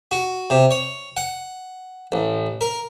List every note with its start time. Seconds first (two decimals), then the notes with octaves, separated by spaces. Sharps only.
0.11 F#4
0.50 C3
0.71 C#5
1.17 F#5
2.12 A1
2.61 A#4